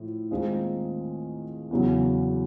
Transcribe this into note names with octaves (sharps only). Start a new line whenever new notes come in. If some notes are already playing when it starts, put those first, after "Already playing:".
Already playing: A2 F3
D#2 D#3 G#3 C4 F4
E2 C#3 F#3